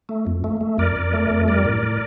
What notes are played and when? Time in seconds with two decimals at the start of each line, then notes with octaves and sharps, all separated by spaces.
0.09 A3
0.27 F2
0.44 A3
0.61 A3
0.78 F2 A#4 D5
0.96 F2
1.13 A3
1.30 F2
1.48 G3 A#4 D5
1.65 A2
1.82 A2